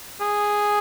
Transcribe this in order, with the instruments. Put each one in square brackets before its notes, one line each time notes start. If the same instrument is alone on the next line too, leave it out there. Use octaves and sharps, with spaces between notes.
[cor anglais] G#4